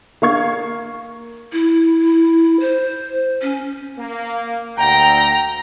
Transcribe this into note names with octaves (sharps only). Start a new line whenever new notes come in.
A#3 F5 C#6 G#6
E4
C5
C#4
A#3
D2 G5 A#5